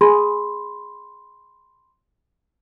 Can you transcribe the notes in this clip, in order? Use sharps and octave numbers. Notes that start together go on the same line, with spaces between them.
G#4 B5 C6